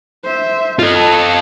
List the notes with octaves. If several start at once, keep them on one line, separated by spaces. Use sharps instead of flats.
C5 E5
F4 A4 D#5